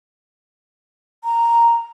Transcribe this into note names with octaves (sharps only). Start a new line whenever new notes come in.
A#5